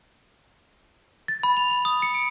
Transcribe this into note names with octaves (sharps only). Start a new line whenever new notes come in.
A6
B5
F7
B5
D#6
C#7
D7